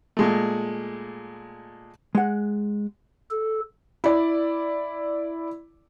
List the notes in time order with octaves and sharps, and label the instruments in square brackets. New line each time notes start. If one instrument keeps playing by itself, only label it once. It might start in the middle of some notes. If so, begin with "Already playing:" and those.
[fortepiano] A#2 G#3 A3
[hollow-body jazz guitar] G#3 F#5
[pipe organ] A4
[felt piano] E4 D5